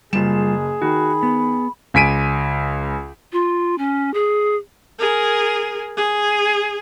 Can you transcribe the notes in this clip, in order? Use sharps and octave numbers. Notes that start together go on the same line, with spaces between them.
F#1 G3 F4 G#4 E7
D#3 F#4 B5
B3
C#2 G#5 B6 D7 D#7
F4
C#4
G#4
G#4 A#4
G#4